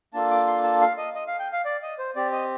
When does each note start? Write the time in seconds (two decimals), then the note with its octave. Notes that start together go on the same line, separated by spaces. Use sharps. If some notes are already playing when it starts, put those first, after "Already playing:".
0.13 A#3 D4 F4 A4 A5
0.30 D6
0.47 C6
0.63 A5
0.81 F5
0.98 D#5
1.15 D#5
1.27 F5
1.39 G5
1.53 F5
1.65 D5
1.83 D#5
1.99 C5
2.15 C4 G4 D5
2.32 D#5